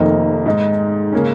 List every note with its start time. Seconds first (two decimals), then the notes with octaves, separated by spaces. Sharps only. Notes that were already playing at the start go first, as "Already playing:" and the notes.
Already playing: F1 F2 D#3 A#3 D#4
0.46 G#2 G#3 D#4
1.12 C#3 A#3 C#4